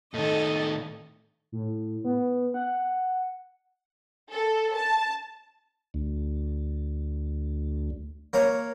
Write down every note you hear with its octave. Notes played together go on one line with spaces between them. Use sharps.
A2 D#3 A4 D#5
A2
B3
F#5
A4
A5
D2
A#3 C#5 A#5